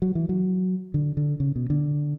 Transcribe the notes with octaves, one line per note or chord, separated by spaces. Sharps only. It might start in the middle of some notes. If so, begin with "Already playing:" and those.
F#3
E3
F#3
D3
D3
C#3
B2
D3